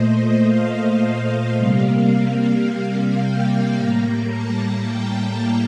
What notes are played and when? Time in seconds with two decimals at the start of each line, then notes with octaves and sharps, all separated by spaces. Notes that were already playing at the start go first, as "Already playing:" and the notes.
Already playing: A#2 A3 C5 D#5
0.47 F5
1.57 C3 G3 A#3
2.13 F5
3.22 G5
3.77 A2 G3 A#3 A#5
4.33 A5
4.87 G5